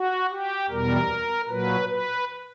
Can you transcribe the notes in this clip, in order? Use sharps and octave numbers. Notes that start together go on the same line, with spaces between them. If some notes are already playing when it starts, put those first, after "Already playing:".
Already playing: F#4
G4
E2 B2 G3 A#4
A#2 F#3 B4
B4